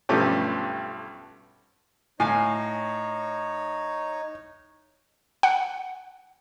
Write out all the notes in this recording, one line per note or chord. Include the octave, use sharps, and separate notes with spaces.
B1 G2 F3 A3 C#4 G4
A2 D#4 C#5 F5 G#5
F#5